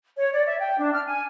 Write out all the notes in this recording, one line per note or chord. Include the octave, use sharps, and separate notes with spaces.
C#5
D5
E5
G5
D4
F6
G#5